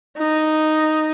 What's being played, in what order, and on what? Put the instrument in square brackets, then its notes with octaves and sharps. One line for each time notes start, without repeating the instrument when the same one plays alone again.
[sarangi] D#4